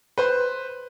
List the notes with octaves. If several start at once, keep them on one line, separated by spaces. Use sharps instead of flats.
B4 C5 C6